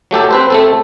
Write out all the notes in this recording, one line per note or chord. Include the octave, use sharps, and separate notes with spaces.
F#3 A3 G4 A4
C4 B4 C5
A3 C4 A4